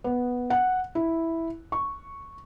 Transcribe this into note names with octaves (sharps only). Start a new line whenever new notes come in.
B3
F#5
E4
C#6